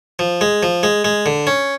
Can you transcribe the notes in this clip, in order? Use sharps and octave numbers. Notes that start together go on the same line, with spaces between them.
F3
G#3
F3
G#3
G#3
D3
C#4